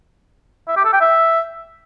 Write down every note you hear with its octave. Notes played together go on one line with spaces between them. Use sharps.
E5
G4
A4
G5
E5